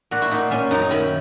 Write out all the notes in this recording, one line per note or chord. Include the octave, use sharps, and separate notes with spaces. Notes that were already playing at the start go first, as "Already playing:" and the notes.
A#2 F#4
E4
A#2 D#4
A#2 C#4
F#2 D#4
D#4
D#3 E4